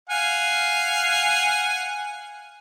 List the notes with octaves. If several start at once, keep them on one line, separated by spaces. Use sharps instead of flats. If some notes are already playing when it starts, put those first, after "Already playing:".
F5 F#5 G#5